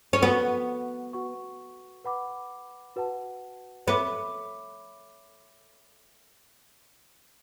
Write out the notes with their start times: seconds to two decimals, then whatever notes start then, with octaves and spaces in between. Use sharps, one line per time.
0.13 C#4
0.22 B3 F#4 B4 F#5 C#6
1.13 F#4 B4 F#5 C#6
2.04 B4 F#5 B5 D6
2.96 F#4 B4 F#5 A5
3.87 B3 C#5 E5 B5 D6